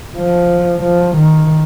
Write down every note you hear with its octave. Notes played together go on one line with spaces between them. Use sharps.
F3
F3
D#3